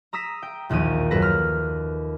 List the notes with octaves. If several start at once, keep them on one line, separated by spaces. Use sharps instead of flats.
A#5 D#6 E6 A#6 B6
G5
E1 A#1 D#2 D#4 D#7
F#2 A4 B4 A#6
F6